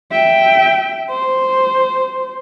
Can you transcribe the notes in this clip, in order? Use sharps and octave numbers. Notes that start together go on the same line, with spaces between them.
E5 G5
C5